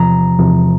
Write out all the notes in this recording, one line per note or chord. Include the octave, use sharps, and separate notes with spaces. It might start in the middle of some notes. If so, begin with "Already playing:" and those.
Already playing: E2 C3 F3 A#5
E2 C3 F3